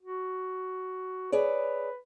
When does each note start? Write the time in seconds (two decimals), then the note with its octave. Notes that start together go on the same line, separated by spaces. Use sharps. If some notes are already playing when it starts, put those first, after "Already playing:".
0.03 F#4
1.32 G#4 B4 C#5 D5